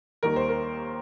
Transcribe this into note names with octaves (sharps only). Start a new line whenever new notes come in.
D#2 D#3 G3 A#4
C5
A#4